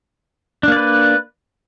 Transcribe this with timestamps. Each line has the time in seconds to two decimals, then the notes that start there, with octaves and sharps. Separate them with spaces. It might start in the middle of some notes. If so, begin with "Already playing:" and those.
0.63 D4
0.68 A#3
0.72 D5
0.76 B4